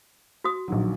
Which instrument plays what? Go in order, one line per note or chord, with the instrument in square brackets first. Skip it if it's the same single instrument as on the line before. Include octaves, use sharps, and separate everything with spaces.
[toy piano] F#4 D#6
[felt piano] A#1 D#3 F#3